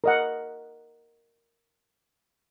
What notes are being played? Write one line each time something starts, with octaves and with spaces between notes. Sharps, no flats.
A#4 D#5 F#5